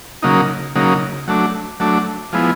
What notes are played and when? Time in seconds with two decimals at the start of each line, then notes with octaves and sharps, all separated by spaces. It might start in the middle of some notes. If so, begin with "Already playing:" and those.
0.23 C#3 F#3 A#3 D#4
0.76 C#3 F#3 A#3 D#4
1.28 F#3 A3 D4
1.80 F#3 A3 D4
2.33 F3 G#3 B3 E4